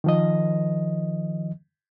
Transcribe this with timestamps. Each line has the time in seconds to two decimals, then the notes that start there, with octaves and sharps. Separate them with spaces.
0.04 D#3 F3 D#5